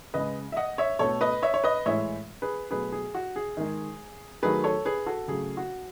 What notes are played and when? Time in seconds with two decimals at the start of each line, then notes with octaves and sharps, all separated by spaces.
0.14 C#3 G#3 B4 D#5
0.52 E5
0.57 D#5 F#5
0.78 C#5 E5
0.99 B2 A3 A4 C#5
1.21 B4 D#5
1.43 C#5 E5
1.54 C#5
1.64 B4 D#5
1.86 A2 E3 G#3 C#5 E5
2.42 G#4 B4
2.71 B2 F#3 A3 G#4 B4
2.92 G#4
3.15 F#4
3.36 G#4
3.57 D#3 G#3
4.43 D#3 F#3 A3 G#4 B4
4.64 A4 C#5
4.85 G#4 B4
5.06 F#4 A4
5.28 C#3 F#3 A3 G#4
5.57 F#4